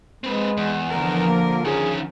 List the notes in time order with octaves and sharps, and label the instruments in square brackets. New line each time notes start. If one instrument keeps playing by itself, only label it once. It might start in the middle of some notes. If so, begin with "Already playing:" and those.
[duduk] G#3 [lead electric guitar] C4 B4
[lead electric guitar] E2
[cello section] D3 A#4 [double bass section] F3
[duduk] A#3
[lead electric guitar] D#3 C#4 [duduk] G#4